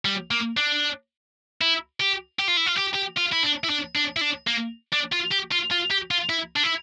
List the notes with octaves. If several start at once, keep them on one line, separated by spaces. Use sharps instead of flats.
G3
A#3
D4
E4
G4
G4
F4
E4
F4
G4
G4
F4
E4
D4
E4
D4
D4
E4
D4
A#3
D4
F4
G4
F4
F4
G4
F4
E4
D4
E4